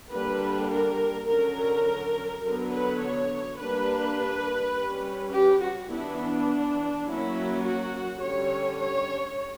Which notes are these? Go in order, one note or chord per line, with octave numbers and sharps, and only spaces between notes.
D3 G3 A#3 D4 B4
A#4
D3 F#3 C#4 A#4
D3 F#3 B3 A#4
B4
C#5
G3 A#3 D4 B4
G3 C#4
G4
F#4
E3 B3 D4 E4
D4
F#3 A#3 C#4 E4
F#4
D3 G3 C#4 C#5
C#5